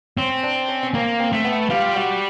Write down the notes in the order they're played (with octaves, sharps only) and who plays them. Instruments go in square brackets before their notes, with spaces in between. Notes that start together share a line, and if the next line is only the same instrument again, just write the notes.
[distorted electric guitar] C4 [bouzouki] C#4
[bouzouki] D4
C#4
C#4
[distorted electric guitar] A#3 [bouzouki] C4
[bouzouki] C4
[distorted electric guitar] A3
[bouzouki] B3
[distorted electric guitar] G3 [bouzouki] F4
[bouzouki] F#4